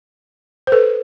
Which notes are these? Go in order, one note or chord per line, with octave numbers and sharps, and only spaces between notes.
C5
A4 B4